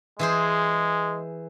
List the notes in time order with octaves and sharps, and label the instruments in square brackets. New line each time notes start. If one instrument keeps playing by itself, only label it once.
[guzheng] E3 G#4 C5 [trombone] G#3